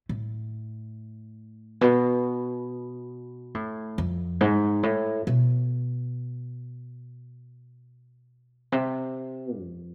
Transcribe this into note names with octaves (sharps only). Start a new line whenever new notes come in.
A2
B2
A2
F2
G#2
A2
B2
C3
F2